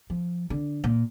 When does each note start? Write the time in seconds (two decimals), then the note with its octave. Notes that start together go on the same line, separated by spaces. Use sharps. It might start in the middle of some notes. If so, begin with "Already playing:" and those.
0.10 F3
0.50 D3
0.84 A#2